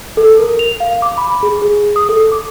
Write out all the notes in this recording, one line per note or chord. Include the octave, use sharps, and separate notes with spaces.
A4
A#4
F7
F5
D6
B5
G#4
G#4
D#6
A4
D6